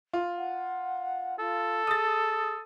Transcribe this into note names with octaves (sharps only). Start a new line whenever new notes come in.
F4
F#5
F4 A4
G#4 D#6 A6